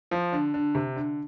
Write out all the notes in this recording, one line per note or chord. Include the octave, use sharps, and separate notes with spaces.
F3
D3
D3
C3
D3